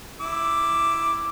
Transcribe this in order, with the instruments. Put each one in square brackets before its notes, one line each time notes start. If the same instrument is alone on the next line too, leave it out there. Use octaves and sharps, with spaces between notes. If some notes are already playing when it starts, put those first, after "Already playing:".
[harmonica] E4 D6 E6